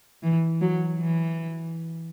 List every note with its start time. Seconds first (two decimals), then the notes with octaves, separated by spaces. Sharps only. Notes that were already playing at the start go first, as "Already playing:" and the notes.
0.23 E3
0.61 F#3
1.00 E3